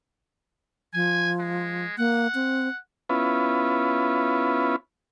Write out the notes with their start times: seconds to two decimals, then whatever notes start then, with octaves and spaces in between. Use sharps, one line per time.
0.94 F3 G#5
1.39 G#3
1.98 A#3 F#5
2.35 C4
3.09 B3 C#4 E4 F4 B4